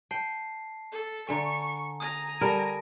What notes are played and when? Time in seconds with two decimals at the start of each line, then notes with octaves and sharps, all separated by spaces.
0.11 G5 A5 C7
0.92 A4
1.29 D3 E5 G#5 A#5 C#6
2.00 G#5 A#5 D#6
2.41 G3 A4 A#4 A5 A#6 D7